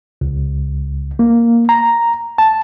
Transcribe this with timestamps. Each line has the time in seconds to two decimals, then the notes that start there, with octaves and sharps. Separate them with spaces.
0.21 C#2
1.19 A#3
1.69 A#5
2.38 A5